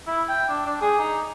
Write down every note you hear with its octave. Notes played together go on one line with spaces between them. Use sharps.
E4
G5
D4
D4
G#4
D#4